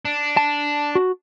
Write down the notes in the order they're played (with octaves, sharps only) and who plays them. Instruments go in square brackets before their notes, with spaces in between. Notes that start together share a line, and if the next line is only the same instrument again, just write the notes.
[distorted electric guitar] D4
[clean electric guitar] A5
F#4